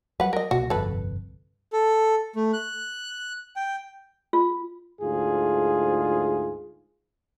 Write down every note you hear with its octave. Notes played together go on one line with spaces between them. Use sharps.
F#3 G3 B4 F#5
A#4 D#5
C2 B2 A#3 F#4
G1 C2 F2 A4 B4
A4
A3
F#6
G5
F4
D2 G#2 F4 G#4